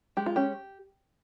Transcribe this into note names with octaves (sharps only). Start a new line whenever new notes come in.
G#3 G4
F4
C#4 G4